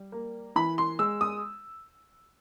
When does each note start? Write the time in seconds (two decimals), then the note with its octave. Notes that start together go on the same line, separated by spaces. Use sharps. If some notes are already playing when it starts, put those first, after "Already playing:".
Already playing: G3
0.12 A#3
0.56 E3 B5
0.78 C6
0.99 G#3 E6
1.21 D#6